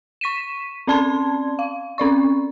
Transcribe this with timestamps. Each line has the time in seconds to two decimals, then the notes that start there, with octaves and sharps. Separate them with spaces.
0.21 C#6 B6 D#7 E7
0.87 C4 C#4 D5 A5 C6 G#6
1.59 F5
1.98 C4 C#4 D5 C#6